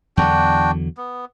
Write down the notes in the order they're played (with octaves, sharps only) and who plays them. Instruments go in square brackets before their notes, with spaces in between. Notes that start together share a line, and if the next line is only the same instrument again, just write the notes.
[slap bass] E2 D3 F#3 [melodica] D4 F#4 G5
[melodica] B3